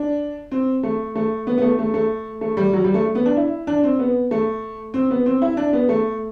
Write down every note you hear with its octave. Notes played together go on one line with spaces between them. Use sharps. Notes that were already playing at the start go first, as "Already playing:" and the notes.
Already playing: D4
C4
A3
A3
B3
B3
A3
A3
A3
A3
G3
F#3
G3
A3
B3
D4
E4
D4
C4
B3
A3
C4
B3
C4
E4
D4
B3
A3